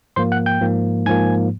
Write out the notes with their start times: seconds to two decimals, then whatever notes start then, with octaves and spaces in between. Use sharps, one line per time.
0.16 G#2 F3 A#3 C5 C6
0.32 F#5 F#6
0.46 G5 G6
0.61 G#2 F3 A#3
1.06 G#2 F3 A#3 G#5 G#6